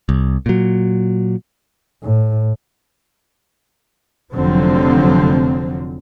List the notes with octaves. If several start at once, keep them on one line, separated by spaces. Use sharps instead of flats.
C2
A#2 F#3
A2
F1 F2 D3 F3 F#3 C4